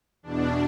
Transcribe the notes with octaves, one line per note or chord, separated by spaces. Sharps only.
E2 B2 D4